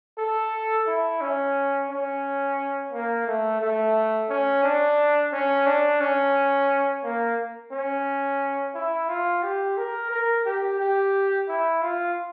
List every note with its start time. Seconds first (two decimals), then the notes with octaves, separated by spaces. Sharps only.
0.18 A4
0.87 E4
1.21 C#4
1.90 C#4
2.92 A#3
3.27 A3
3.61 A3
4.29 C#4
4.64 D4
5.32 C#4
5.66 D4
6.01 C#4
7.04 A#3
7.72 C#4
8.75 E4
9.09 F4
9.43 G4
9.77 A#4
10.11 A#4
10.45 G4
10.80 G4
11.49 E4
11.82 F4